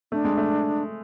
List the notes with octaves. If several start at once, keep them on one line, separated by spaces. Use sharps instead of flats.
A3 D4
G#3
A3